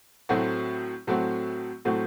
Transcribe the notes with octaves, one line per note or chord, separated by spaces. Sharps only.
A2 F#3 A3 C4 F#4
A2 F#3 A3 C4 F#4
A2 F#3 A3 C4 F#4